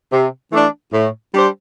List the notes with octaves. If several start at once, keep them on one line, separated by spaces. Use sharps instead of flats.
C3
E3 A3 D4
A2
G3 D4 G4 C5